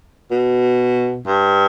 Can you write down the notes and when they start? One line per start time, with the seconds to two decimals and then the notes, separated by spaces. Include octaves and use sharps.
0.31 B2
1.26 G2